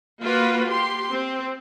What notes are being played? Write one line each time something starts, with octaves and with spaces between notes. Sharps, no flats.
A#3 F4 F#4 B4
G4 C6
C4